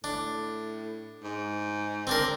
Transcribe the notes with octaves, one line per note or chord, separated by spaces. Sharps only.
A2 D4
G#2
C4 D4 A#4